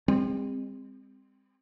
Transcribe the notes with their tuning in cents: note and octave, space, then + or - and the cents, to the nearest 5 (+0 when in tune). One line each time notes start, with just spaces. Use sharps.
G#3 -45 C4 +0